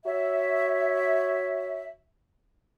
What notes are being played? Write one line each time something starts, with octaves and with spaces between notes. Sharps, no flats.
F#4 C#5 E5